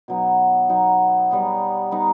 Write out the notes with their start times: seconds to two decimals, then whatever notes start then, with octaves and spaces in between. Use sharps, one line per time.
0.08 B2 F#3 B3 D#4
0.69 B2 F#3 B3 D#4
1.31 G3 B3 D#4
1.91 G3 B3 D#4